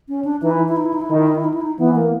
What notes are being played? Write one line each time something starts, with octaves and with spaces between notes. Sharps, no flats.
C#4
D4
E3 D#4
E4
D#4
E4
D#4
E4
D#4
E4
D#3 D#4
E4
D#4
E4
D#4
E4
D#4
E3 B3
A#3